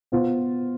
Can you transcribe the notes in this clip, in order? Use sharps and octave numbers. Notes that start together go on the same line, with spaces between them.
B2 B3 F4 C5